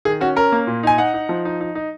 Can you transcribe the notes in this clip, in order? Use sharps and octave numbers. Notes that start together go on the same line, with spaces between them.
D#3 G#4
C#4 F#4
C#4 A#4
A#3
A#2
D#4 G#5
D#4 F#5
D#4
F3
D#4
D#4
D#4